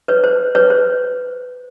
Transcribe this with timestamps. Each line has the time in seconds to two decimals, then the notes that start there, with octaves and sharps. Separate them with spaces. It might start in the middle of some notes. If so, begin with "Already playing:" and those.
0.08 B4 C#5
0.24 C5
0.55 B4 C#5
0.70 C5